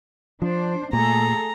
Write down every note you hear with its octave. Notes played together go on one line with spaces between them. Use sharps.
F3 D4 C5
A#2 A3 G#4 A4 A#5